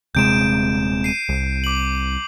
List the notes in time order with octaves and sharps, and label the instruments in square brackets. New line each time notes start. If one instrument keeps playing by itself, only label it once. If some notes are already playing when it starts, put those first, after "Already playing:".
[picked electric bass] D#1 C3 G#3 [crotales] G6 D7 E7
[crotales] C7 D#7
[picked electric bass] C2
[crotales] D6 F#7